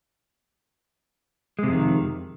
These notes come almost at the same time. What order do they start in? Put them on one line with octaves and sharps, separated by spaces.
G#3 C3 F2 D#3